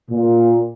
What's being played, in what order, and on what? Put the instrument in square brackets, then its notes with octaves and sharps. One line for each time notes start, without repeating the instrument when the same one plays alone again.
[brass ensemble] A#2